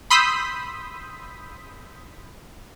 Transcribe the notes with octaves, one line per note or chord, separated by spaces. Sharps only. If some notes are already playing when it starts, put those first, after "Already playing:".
B5 C6 D#6 E6 G6 B6